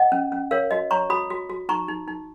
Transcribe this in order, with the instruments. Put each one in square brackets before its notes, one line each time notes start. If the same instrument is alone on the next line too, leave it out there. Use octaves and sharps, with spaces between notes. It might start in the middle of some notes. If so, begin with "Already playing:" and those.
Already playing: [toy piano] D#5 F#5
C#4
C#4
A#4 C#5 F5
F#4 D#5
C#5 A#5 C#6
F#4 B5 D#6
F#4
F#4
D#4 A#5 C#6
D#4
D#4